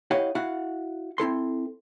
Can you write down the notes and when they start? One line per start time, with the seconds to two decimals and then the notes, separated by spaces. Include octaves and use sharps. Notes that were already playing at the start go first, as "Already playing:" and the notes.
0.11 E4 G4 C#5 D#5 F5 F#5
0.35 E4 F#4 F5 F#5
1.18 C4 E4 A4 C6